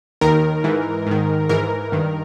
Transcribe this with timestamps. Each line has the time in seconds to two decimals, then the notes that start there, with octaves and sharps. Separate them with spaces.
0.21 D#2 D#3 A#4
0.64 G#2 E3
1.07 G#2 D#3
1.49 G#2 E3 A#4
1.92 G2 D#3